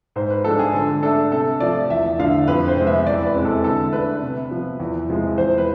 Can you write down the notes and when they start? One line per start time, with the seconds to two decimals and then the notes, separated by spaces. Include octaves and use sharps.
0.16 G#2 C5
0.30 B4
0.44 F3 G#3 D4 A4
0.59 G#4
0.73 D3 A4
1.02 A3 D4 A4
1.32 C3 A4
1.60 F3 A3 D5
1.90 E2 E5
2.19 D3 F3 A3 D4 F5
2.48 F2 B4
2.68 C5
2.77 C3 G#3 B3
2.87 E5
3.06 E2 D5
3.25 B4
3.35 C3 G#3 C4
3.45 A4
3.64 D3 A4
3.93 A3 D4 B4
4.22 C3
4.51 F3 B3
4.80 E2
5.09 C3 F3 G#3
5.38 E2 C5
5.58 B4